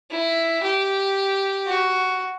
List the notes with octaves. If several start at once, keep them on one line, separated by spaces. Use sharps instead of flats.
E4
G4
F#4